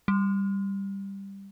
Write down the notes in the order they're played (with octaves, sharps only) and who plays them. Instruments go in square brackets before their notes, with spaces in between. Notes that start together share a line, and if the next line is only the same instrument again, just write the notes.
[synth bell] G3